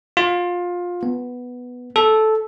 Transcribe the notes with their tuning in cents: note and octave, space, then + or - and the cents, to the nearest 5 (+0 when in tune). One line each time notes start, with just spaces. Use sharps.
F4 +20
B3 +0
A4 -10